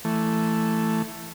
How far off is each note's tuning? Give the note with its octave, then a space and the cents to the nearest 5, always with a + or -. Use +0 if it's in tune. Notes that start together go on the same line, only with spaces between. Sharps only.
E3 +10 A3 +0